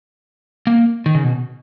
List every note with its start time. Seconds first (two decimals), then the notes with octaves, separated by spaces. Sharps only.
0.67 A#3
1.06 D#3
1.15 C#3
1.24 B2